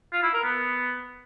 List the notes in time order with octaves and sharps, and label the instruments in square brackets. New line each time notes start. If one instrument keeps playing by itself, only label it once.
[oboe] F4
E4
A#4
B3